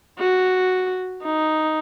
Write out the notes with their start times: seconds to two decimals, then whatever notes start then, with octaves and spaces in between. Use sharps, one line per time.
0.19 F#4
1.23 D#4